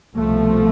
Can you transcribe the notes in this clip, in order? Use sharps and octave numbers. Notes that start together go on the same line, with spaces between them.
C2 B2 F3 A3